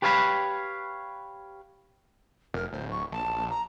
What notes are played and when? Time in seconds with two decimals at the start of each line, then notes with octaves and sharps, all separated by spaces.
0.02 G4 B4 C#5 F5 G#5 B5
2.54 F1 A#4
2.72 D1 C5
2.90 C#6
3.12 A#1 A5
3.49 A#5